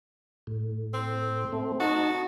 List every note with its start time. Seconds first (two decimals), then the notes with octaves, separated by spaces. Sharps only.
0.47 A2
0.94 C4
1.52 A3 C4
1.80 D#4 F#4 A5